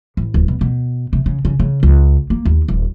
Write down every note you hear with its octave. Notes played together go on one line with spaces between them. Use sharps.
A1
D1
B2
B2
C3
C#3
C#3
C#3
C#2
A#3
D#2
D#1